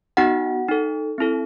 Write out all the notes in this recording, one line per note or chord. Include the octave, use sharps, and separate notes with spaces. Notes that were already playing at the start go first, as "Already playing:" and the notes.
B3 D#4 F#4 F#5
D#4 A4
C4 E4 A4